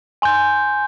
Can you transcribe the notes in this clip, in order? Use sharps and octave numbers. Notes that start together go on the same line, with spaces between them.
G#5 C6 G6